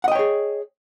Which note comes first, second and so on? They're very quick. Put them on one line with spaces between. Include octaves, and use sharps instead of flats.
F#5 D#5 G5 C#5 G#4